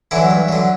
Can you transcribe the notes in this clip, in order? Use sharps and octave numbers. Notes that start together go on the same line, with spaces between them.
D3 E3 F#3 E4
G2
D3 F#3